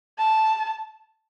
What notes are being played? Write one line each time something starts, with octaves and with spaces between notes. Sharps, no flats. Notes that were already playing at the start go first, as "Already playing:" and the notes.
A5